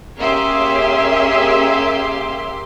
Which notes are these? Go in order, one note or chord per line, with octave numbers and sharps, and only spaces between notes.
A#3 C#4 G4 G#4 E5 C6